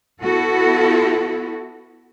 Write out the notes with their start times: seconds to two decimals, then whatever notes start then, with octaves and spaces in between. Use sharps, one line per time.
0.22 B3 E4 F#4 A4